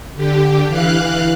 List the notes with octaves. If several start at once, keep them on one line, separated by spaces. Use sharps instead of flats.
D3 G4
E3 F5 F#6